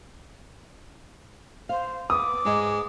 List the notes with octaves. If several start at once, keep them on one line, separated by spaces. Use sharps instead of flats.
C5 F5
B3 D6 D#6
G#2 G#3 D#5